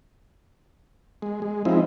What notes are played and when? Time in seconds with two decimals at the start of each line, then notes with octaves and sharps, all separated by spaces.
1.22 G#3
1.42 G#3
1.65 F3 G#3 C4 D#4 E4